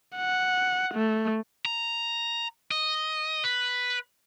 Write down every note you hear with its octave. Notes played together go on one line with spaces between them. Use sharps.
F#5
A3
A#5
D#5
B4